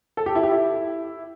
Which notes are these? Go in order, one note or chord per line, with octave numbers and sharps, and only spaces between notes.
A4
G4
E4
G4
E4